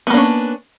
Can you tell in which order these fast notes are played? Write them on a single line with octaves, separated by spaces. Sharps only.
B3 A#3 D4 C#4